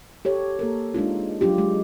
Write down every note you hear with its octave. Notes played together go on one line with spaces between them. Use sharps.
G4 A4 C#5
A#3 A4 A#4
G#3 D4 D#4 F4
F#3 D4 F4 G4
G#3